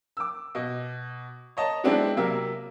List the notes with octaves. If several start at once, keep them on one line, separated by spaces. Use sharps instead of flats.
D6 E6
B2 D#5
C#5 D#5 A5 A#5
G#3 B3 C4 D4 E4 F#4
C3 F#3 A#3 A#4 E5 E6